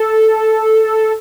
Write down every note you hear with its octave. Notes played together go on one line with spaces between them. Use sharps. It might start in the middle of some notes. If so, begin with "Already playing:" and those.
Already playing: A4